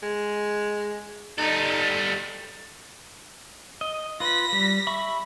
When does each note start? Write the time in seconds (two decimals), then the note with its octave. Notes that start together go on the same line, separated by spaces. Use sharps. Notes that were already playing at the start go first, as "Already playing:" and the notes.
0.03 G#3
1.38 G3 D#4 A4
3.81 D#5
4.20 F4 B4 A#6 B6
4.53 G3
4.87 E5 B5 C#6